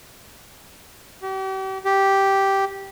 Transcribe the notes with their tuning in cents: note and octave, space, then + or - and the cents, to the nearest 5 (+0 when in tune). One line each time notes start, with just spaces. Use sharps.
G4 -40
G4 -5